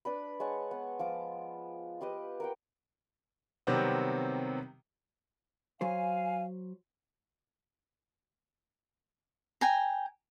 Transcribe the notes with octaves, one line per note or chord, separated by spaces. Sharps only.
D4 B4 B5
G#3 C#5 F#5 A5
B3
F3 F4 D6
F4 G4 B4 D#5
A#4 F#5 G5
C3 D#3 F#3 G3 B3 C4
F#3 C5 F5 G#5
G5 G#5 A#5